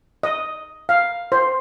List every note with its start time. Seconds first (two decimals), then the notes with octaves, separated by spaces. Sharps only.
0.23 D#5
0.89 F5
1.32 C5